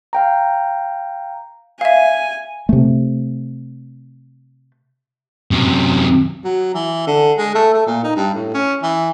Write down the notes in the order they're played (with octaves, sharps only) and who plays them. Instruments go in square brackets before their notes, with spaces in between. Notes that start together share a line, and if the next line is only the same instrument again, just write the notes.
[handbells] F5 G5 A#5
[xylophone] E5 F5 [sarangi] G#5
[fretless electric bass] C3 A3
[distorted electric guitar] F#2 C3
[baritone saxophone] F#3
E3
D3
G#3
A3
A3
A#2
D#4
G2
A2
C#4
E3